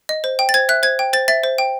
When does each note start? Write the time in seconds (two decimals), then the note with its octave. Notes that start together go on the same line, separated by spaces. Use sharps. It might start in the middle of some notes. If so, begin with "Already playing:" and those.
0.09 D#5
0.24 C5
0.39 G5
0.49 A6
0.54 C5 G#6
0.69 E5 F#6
0.83 C5 G#6
0.99 G5
1.13 C5 A6
1.28 E5 A6
1.44 C5
1.58 G5